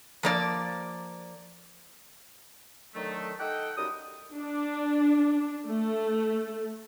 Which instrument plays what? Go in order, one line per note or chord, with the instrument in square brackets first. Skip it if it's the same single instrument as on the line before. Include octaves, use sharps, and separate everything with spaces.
[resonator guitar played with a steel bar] F3 A#3 D5
[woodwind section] D3 D#3 F#3 A3
D#4 A4 D#5 F#5 G5
F#2 G3 D#4 D#6
[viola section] D4
A3